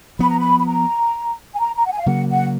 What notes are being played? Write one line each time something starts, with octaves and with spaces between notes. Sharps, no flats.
F3 B3 B5
A#5
B5
B5
A#5
G#5
A#5
A#5
F#5
G#5
F5
C#3 F#3 A#3 F#5
F#5